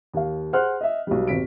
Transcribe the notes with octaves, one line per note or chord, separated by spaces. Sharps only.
D#2 F5
G#4 C5 F#5 C6 F6 F#6
D#5 E5
B1 B2 G3
D#1 G#1 B6 D7